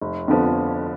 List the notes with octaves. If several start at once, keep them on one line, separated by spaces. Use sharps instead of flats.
F1
F2 D3 F3 B3